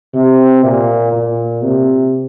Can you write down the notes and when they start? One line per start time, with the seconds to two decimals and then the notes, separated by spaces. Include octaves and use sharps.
0.14 C3
0.64 A#2
1.13 A#2
1.62 C3